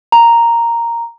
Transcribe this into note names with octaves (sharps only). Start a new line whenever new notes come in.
A#5